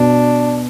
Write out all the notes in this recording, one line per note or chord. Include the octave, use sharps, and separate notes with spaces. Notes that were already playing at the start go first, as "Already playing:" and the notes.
Already playing: B2 D4